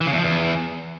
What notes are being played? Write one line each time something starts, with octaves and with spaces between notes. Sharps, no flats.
E3
C#3
E2
F3
E2